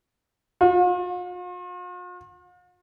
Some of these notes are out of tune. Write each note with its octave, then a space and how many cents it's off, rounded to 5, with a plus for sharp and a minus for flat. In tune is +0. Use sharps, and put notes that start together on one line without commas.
F4 +45